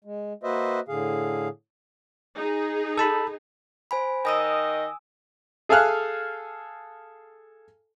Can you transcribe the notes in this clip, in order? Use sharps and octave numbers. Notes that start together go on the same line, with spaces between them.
G#3
A#3 F#4 B4 C5 D#5 E5
A2 D3 G#4 F5
D#4 G#4
A4 A5 B5
C5 G#5 B5
D#3 D#5 G#5 D#6 E6
G#4 A4 F5 G#5 F6 F#6